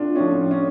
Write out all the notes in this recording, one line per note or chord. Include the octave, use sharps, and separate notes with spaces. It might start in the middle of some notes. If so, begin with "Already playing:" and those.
Already playing: A2 D4 F4
A2 F3 C#4
C#4